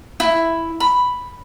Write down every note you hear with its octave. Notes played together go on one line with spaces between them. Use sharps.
E4
B5